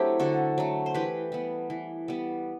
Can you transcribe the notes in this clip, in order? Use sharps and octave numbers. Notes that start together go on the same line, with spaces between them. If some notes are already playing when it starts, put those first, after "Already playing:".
Already playing: F#3 A3 C4 D4 E4 G4
D3 F#4 A4
F#3 A3
C5
E3 G4 B4
G3 B3
E3
G3 B3